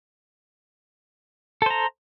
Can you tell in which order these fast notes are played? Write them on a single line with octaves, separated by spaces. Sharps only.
A4 C5 A#5